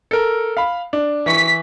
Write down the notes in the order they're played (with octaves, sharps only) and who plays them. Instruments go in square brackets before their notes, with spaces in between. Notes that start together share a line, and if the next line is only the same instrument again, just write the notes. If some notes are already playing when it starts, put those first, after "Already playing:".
[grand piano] A4 A#4
F5 B5
D4
[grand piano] E3 C#6 [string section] B6